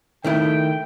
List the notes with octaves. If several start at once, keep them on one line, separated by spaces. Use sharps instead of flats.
D#3 A3 E4 G5